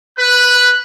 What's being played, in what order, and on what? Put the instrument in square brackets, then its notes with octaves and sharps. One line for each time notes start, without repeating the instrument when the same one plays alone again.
[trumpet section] B4 [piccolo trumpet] F#6